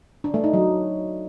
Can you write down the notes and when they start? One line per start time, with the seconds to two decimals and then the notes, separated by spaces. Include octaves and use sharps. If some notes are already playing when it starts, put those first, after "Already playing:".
0.24 D4
0.34 A3
0.44 D#4
0.54 F#3